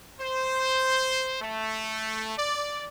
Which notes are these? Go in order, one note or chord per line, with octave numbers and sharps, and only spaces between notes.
C5
A3
D5